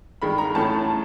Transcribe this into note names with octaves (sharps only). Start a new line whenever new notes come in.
G2 D#3 G#3 B5
A#5
A2 E3 A3 C#4 A5